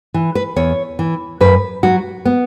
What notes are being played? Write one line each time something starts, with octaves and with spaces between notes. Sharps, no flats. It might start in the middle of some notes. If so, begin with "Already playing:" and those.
E3
B4
E2 C#5
E3
F#2 B4
F#3 F#4
B3